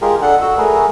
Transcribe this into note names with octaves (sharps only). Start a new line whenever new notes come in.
G#3 F4 G4 G#4 A#4
D4 A4 F#5
F#4 E6
A3 G#4 A#4 B4